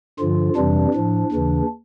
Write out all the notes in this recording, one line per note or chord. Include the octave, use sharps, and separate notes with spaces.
G2 D3 F3 F4
F2 C3 E3 G3 D4
A2 F3
D#2 C#3 E3